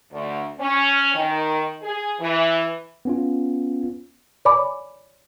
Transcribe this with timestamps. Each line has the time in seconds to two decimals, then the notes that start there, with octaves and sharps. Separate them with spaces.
0.12 D2
0.59 C#4
1.15 D#3
1.82 G#4
2.20 E3
3.05 B3 C#4 F4
4.45 C#5 D5 G#5 B5 D6